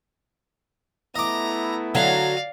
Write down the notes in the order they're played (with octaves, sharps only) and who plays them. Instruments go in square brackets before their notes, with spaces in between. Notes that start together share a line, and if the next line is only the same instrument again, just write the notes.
[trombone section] A3 B3 E4 [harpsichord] D#5 D6 [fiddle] A#5
[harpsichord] D3 [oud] F#3 [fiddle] D5 F5